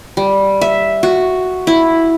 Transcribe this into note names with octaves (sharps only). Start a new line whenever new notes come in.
G3
E5
F#4
E4